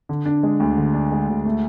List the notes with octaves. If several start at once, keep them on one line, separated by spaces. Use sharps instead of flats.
D3
D4
G#3
D2
D3
D4
G#3
D2
A3